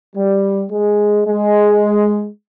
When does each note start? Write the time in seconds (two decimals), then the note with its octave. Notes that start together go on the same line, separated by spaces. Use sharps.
0.15 G3
0.71 G#3
1.27 G#3